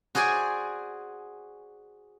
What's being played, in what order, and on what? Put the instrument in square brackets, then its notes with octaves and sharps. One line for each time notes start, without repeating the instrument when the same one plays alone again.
[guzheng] F#4 G#4 C5 D5 G#5